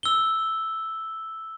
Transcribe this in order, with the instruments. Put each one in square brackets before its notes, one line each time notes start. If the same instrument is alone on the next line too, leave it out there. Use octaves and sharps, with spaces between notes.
[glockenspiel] E6 G7